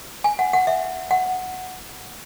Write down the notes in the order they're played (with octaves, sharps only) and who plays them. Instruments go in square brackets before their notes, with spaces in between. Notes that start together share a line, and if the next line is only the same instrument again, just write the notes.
[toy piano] G#5
F#5
F#5
E5
F#5